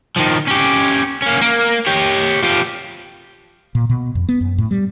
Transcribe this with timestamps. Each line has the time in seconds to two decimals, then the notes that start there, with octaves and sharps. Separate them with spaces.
0.17 D#3 F3
0.48 C#4 G4
1.22 A#3 C#4
1.41 A#3
1.87 G4 C#5
2.42 F3 G4
3.75 A#2
3.89 B2
4.15 F2
4.29 B3
4.41 F#2
4.58 A2
4.71 G3